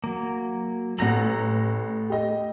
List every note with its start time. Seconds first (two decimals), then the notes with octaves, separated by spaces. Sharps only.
0.04 F#3 A#3
0.98 A1 A3 A4 A#5 A#6 F#7
2.10 G4 D#5